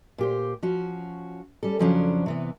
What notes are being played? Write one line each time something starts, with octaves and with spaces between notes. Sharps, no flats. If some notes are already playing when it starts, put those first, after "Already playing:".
A#2 G4 C5
F3 C#4 F#4
G3 C#4 A4
F2 C#3 F3 F#3 C#4 D4
C3 E3 B3